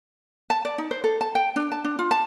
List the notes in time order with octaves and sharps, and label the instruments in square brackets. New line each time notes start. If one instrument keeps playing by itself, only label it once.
[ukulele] A5
D5
D#4
C5
A4
A5
G5
D4
A5
D4
F4
A5